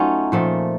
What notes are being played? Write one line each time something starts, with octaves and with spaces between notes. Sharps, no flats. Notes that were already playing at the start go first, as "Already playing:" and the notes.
Already playing: F#3 A3 C#4 D#4 F4
A#2 F3 A3